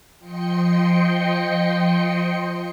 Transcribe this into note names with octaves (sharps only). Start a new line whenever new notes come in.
F3 D#5 G5 C6 C#7